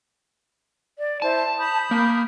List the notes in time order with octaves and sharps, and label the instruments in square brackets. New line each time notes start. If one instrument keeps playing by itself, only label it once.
[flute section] D5
[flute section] E4 C5 [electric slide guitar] A5
[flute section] B5 D#6 G6
[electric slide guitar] A#3